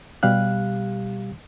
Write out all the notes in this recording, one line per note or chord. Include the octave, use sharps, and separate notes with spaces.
B2 G3 G4 F5 F#6